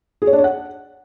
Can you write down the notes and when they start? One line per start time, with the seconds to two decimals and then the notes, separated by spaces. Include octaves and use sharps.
0.22 G#4
0.27 C#5
0.33 D4
0.38 C#5
0.44 F#5